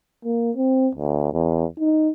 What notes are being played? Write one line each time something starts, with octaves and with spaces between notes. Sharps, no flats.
A#3
C4
D2
E2
D#4